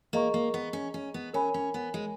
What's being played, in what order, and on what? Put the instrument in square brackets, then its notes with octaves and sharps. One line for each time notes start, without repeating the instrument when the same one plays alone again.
[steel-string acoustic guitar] A#3 [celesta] G#4 D#5 A#5 C#6
[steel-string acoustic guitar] A#3
B3
C#4
C#4
B3
[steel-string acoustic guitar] C#4 [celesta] A#4 C#5 G#5 B5
[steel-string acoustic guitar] C#4
B3
G#3